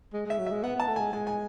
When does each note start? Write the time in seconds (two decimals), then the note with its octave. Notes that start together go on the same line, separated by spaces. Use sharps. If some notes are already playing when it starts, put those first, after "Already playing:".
0.13 G#3
0.26 G#3 E5
0.38 F#3
0.47 G#3 E5
0.63 B3 F#5
0.76 B3 A5
0.88 A3
0.96 G#3 G#5
1.13 G#3 G#5
1.27 G#5